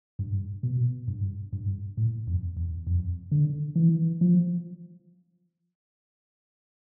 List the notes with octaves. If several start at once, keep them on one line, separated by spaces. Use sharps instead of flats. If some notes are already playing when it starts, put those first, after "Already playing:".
G2
B2
G2
G2
A2
F2
E2
F2
D3
E3
F3